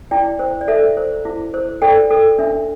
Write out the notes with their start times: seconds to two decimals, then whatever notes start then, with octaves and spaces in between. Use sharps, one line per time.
0.11 E4 D5 G5
0.39 C5
0.61 D5
0.68 A4 E5
0.97 C5
1.25 E4
1.54 C5
1.82 A4 D5 G5
2.10 A4
2.38 D4 E5